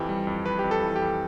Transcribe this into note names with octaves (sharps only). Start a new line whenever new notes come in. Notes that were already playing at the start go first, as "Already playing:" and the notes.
Already playing: F2 E3 G4
G3
F2
F2 B4
G4
F2
A4
E3
G4
F2